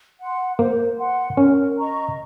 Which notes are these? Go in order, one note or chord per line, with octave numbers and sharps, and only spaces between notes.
F#5 C6
A#3 C5
F#5 C6
C#4 A#4
D#5 A#5 C#6